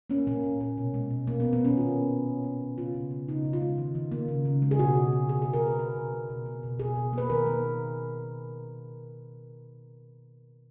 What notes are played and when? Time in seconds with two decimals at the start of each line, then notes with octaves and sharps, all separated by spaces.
0.10 A#3 C#4
0.27 A#2 A#3
0.44 A#2
0.60 A#3
0.78 B2
0.94 G#3
1.11 B2
1.27 B2 A#3
1.40 B3
1.44 G#3
1.53 B3
1.61 B2 C#4
1.77 D#3 F4
1.94 G#3
2.10 D#3
2.28 D#3
2.44 A#3
2.61 D#3
2.78 C#3 F4
2.95 C#3
3.11 A#3
3.28 C#3 D#4
3.45 C#3
3.53 F4
3.62 G#3
3.78 D#3
3.95 D#3
4.12 A#3
4.28 C#3
4.45 C#3
4.62 G#3
4.71 G#4
4.79 B2 F#4
4.95 B2
5.12 A#3
5.29 C#3 G#4
5.42 C#3 G#4
5.53 A#4
5.63 G#3 B4
5.79 B2 B4
5.96 B2
6.13 A#3
6.29 B2
6.46 A#3
6.63 B2
6.79 B2 G#4
6.97 B2
7.13 A#3 B4
7.30 D#3 A#4
7.47 A#3